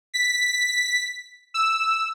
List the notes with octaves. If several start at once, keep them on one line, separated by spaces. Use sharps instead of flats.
B6
E6